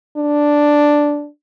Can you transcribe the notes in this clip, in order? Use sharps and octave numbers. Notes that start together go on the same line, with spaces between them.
D4